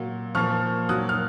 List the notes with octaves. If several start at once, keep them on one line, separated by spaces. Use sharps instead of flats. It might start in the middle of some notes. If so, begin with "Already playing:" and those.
Already playing: A#2 F#3
A#2 F3 C#6 F6
A#2 F#3 D#6 F#6
F6